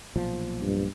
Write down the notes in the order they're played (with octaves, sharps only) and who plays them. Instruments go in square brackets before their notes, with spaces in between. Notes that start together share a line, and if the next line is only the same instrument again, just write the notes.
[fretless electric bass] B1 A#2 F3
[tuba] G2